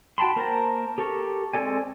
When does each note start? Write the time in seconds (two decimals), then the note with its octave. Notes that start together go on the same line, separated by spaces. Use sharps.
0.18 F#4 G5 A5 B5 C6
0.36 A#3 A#4 C5 A5 A#5
0.98 G4 A4 A#4 C#6
1.53 G#3 C4 A4 D5 G#5